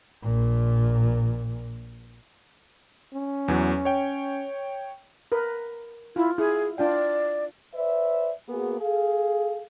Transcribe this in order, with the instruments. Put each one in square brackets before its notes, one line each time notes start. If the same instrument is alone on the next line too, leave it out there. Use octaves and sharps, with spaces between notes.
[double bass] A#1 A#2
[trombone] C#4
[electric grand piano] E2 E3 F#3
C#5 G5
[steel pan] A#4 B4
[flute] E4 [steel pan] F4
[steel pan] E4 [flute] G#4
[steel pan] D4 F4 G5 [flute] D5
[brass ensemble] B4 C5 D5 E5
A#3 B3 F#4 G#4
G#4 A4 F5